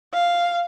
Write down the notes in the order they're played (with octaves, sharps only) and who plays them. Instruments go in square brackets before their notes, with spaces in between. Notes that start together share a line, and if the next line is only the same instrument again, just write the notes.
[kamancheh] F5